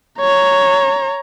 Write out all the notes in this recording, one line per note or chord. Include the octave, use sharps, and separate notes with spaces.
C#5 A#5